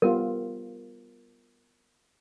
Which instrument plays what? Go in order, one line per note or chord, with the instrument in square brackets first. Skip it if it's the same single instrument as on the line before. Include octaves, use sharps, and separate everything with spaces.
[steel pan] G3 B3 F4 [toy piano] A#4